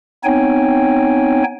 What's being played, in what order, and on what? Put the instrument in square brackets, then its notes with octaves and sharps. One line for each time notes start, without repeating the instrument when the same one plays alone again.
[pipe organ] B3 C4 D#4 C#5 G5 G#5